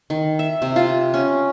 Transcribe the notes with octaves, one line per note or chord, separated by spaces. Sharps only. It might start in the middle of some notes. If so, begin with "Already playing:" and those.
D#3
E5
C3
F4
C#4